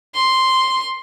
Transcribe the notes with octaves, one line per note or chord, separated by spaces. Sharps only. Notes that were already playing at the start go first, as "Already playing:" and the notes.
C6